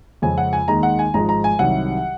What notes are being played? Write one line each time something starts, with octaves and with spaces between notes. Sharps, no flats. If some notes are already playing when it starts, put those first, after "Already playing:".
F2 C#3 F3 G#3 G#5
F#5
G#5
D#2 D#3 G#3 A#5
F#5
G#5
G#1 G#2 F3 G#3 A#5
A#5
G#5
C2 C3 D#3 F#3 F#5